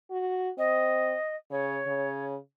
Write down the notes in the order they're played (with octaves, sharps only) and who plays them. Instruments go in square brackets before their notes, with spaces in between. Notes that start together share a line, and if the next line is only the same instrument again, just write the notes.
[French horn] F#4
[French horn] C4 [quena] D#5
[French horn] C#3 [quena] C#5
[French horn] C#3